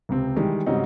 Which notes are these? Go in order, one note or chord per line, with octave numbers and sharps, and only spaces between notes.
C#2 C3 C4
D#3 E3 G3 G#3
G#2 C#3 G3 C4 D#4 F#4